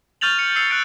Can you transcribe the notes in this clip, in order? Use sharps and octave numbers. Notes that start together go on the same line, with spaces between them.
C#6 F6 G6 A6 F7 F#7
C#7
E6 C7 C#7 F7
F#6 A6 D7